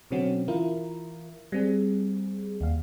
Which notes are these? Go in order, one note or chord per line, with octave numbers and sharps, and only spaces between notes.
B2 D3 F#3 C4 C#4 F#4
E3 E4 F4 A#4
G3 C4 G#4
D#2 F5